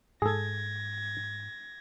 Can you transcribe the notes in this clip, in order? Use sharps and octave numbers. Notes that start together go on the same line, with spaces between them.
G#2 G#4 A4 G#6 A#6